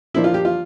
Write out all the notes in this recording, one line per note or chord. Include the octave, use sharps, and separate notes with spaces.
D3 F3 A#3 D4 E4
F4
G4
F4